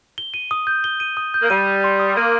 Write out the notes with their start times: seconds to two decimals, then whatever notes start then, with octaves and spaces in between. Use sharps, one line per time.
0.18 G7
0.34 D#7
0.51 D#6
0.67 G6
0.84 G7
1.00 D#7
1.17 D#6
1.34 G6
1.42 A#3
1.50 G3 D#7
1.68 G6
1.84 C6
2.00 D#6
2.17 A#3 D#7